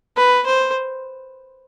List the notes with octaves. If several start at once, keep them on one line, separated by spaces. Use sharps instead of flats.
B4
C5